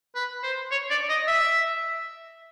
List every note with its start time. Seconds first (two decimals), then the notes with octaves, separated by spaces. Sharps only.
0.15 B4
0.43 C5
0.71 C#5
0.90 D5
1.09 D#5
1.27 E5